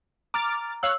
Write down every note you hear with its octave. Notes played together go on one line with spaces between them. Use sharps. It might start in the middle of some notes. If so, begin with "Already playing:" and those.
A#5 D6 F6 A6
C#5 F5 E6 F#6